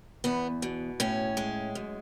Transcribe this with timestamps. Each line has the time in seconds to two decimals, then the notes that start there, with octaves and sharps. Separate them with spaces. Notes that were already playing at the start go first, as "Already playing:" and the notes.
0.24 E2 B3
0.62 B2
1.00 A2 C#4
1.37 G#3
1.75 F#2